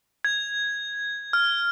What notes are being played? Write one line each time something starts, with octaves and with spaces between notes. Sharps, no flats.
G#6
F6